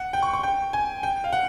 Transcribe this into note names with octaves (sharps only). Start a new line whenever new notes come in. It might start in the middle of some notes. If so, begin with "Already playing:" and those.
Already playing: F#5
G5
C#6
C#6
G5
G#5
G5
F5
F#5